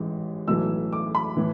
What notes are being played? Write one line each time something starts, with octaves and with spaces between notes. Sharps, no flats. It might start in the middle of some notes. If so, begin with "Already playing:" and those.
Already playing: A1 G#2 E3
B1 A2 E3 E6
D6
B5
A2 E3